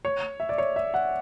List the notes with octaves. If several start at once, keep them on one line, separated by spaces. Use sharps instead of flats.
C#5
E5
D5
C#5
E5
F#5